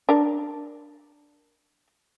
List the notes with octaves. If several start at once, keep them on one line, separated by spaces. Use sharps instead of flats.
D4 A#4